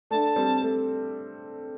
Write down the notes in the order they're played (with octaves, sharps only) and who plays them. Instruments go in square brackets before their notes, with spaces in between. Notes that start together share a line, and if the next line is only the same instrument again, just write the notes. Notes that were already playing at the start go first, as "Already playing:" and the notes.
[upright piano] A3 D4 [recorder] A5
[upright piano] G3 C4
A3